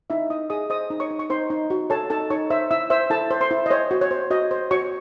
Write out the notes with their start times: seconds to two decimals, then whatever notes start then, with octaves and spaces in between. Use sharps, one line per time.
0.10 D#4 E4 E5
0.30 D#4 D#5 D#6
0.50 G#4 D#5 D#6
0.70 C5 D#5 D#6
0.90 D#4
1.00 C#5 C#6
1.11 D#4
1.19 C#6
1.30 D#4 C5 C6
1.50 D#4
1.70 F#4
1.90 A4 C#5 A5
2.10 D#4 A4 A5
2.30 D#4 C#5 C#6
2.50 C5 E5 E6
2.71 E4 E5 E6
2.90 C5 E5 E6
3.10 E4 A4 A5
3.31 C5
3.41 C5 C6
3.51 E4
3.66 D#5
3.70 C5 C#5
3.91 F#4
4.01 C#5
4.11 C5
4.30 F#4 D#5
4.51 C5
4.71 F#4 C#5 C#6